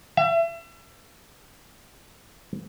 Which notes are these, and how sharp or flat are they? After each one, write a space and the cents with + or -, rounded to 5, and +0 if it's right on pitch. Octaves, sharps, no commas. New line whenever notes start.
E5 +35